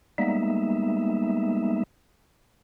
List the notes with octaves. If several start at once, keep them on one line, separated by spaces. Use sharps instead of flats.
G3 G#3 A#3 B3 D#4 E5